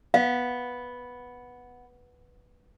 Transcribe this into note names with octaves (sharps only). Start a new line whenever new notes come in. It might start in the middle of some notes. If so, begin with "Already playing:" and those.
B3 F5